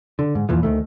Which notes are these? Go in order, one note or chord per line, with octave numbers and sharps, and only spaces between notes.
D3
G#2
E2 A#2 E3 F3
D2 D#3 A3